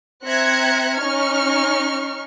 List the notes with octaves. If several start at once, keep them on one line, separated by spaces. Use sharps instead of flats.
C4 E5 A#5 F#6 G#6 C#7
C#4 D#4 C#6 F6